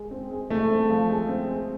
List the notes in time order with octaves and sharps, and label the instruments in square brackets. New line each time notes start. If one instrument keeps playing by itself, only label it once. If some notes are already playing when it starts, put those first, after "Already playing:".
Already playing: [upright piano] G#3
C4
G#3
[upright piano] G#3 [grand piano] A3
[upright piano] C4
F3
G#3
C4
G#3